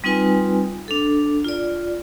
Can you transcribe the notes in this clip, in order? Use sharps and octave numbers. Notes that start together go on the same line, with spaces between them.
G3 C4 D#4 F4 B4 G#5
D4 A4
F4 D5